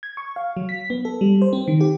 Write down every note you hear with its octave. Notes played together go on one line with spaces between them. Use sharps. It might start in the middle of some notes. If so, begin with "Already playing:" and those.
G#6
C#6
F5
F#3
B6
B3
A4
G3
C5
C4
D#3
G4